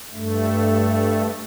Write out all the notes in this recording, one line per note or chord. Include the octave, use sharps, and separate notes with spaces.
G2 A3